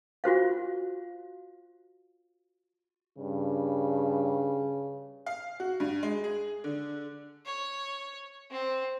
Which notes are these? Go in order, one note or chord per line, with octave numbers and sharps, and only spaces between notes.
F4 F#4 C5 F5
G2 C#3
F5
F#4
G2
G#3
G#4
D3
C#5
C4